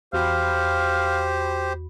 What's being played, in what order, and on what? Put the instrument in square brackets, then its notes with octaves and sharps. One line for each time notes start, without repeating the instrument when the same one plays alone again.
[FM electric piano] E2 F#4 B5 [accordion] G4 C5 [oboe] F5